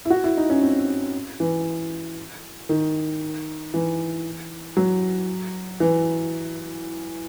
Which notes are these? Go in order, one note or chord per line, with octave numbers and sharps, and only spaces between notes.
E4
F#4
E4
D#4
C#4
C4
E3
D#3
E3
F#3
E3